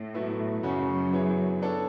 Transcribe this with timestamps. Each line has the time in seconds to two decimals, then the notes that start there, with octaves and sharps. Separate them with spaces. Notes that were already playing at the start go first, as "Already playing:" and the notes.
Already playing: A2
0.14 B2 F#3 A3 E4 B4
0.63 F#2 C#3 F#3 C#4 F#4
1.13 F#3 B3 E4 G#4 C#5
1.62 B3 D4 A4 C#5